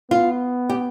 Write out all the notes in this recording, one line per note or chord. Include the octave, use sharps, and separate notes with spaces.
B3 F4
G4